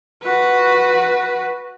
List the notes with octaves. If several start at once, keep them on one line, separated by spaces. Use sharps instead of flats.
F#4 B4